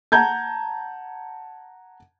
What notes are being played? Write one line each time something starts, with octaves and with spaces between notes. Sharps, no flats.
F#5 A5 A#5 G6 G#6